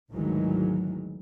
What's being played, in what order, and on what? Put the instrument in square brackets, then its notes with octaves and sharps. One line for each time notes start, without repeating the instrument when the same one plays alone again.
[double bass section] G#1 D2 D#3 E3 F#3 G#3